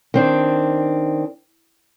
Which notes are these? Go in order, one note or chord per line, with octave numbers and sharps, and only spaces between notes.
D#3 C4 D4